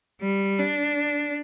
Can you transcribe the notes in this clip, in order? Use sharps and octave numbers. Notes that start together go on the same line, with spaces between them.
G3
D4